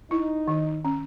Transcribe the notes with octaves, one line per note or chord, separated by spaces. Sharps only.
D#4 E4
D#3
C#4